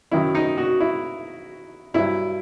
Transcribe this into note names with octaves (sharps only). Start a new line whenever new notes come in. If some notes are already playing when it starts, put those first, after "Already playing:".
F#2 D#3 F#3 E4
D#4
F#4
E4
G2 F#3 E4